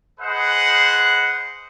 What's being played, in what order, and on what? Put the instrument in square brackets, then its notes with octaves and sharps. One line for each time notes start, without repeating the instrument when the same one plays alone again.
[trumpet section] G#4 B4 C5 D#5 F#5